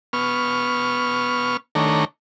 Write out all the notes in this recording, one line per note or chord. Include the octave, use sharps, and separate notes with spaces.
B3 C#6 F6
D#3 A3 D4 C#5 A#5